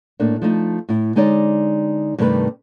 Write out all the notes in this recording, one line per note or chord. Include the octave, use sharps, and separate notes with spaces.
A2 A3 A#3 D4
F3 A3 D#4
A2 E4
D3 G#3 D#4 C#5 D5
G2 C3 D#3 A3 A#4 B4